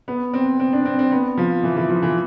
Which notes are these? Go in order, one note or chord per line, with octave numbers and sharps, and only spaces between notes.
B3
C4
C4
D4
C4
C4
B3
F3
E3
E3
F3
E3